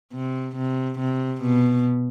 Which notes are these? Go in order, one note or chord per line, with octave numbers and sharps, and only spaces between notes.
C3
C3
C3
B2